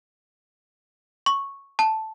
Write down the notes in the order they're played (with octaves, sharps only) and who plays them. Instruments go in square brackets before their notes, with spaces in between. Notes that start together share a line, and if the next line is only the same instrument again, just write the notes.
[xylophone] C#6
A5